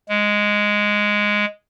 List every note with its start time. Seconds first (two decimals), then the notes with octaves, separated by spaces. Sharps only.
0.09 G#3